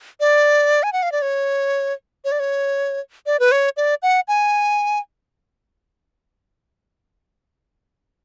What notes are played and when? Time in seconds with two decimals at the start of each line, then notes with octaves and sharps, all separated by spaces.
0.20 D5
0.83 G#5
0.93 F#5
1.03 F5
1.12 D5
1.22 C#5
2.25 C#5
2.32 D5
2.40 C#5
3.26 D5
3.40 B4
3.52 C#5
3.77 D5
4.03 F#5
4.28 G#5